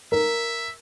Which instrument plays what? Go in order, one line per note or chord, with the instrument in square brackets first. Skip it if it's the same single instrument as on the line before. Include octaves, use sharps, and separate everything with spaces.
[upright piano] A#4 [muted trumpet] E5